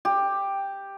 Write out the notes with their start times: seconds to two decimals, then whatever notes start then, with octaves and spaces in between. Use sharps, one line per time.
0.05 G4